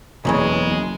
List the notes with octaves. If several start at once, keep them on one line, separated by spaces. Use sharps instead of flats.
F#1 B1 E2 C#3 G#3